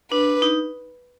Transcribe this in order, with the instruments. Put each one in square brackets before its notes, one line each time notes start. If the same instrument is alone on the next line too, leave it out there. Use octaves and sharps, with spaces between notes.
[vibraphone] D4 [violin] B4
[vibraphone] D#4